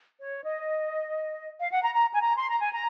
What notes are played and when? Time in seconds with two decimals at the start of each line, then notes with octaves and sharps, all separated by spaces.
0.20 C#5
0.43 D#5
1.59 F5
1.71 F#5
1.82 A#5
1.95 A#5
2.13 G#5
2.21 A#5
2.36 C6
2.48 A#5
2.60 G#5
2.72 A#5